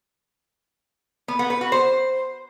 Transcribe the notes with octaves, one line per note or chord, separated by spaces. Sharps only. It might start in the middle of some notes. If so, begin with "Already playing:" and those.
B3
B3
B4
F#4
C5